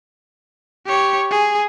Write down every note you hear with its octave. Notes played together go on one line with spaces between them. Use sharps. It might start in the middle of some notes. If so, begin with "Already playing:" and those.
G4 C#5
G#4